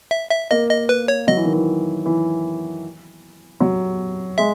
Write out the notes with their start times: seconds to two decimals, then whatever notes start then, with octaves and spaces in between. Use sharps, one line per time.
0.11 E5
0.31 E5
0.51 A#3 D#5
0.70 D#5
0.89 B4
1.08 C#5
1.27 F#3 D#5
1.37 E3
1.45 D#3
1.53 E3
2.06 E3
3.60 F#3
4.38 G#3 E5